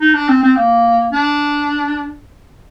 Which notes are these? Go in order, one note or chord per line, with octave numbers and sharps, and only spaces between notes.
D#4
D4
C4
C4
A#3
D4